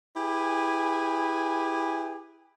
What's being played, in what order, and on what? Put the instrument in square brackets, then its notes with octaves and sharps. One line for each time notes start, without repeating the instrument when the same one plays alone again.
[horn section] E4 G4 G#4 B4 G#5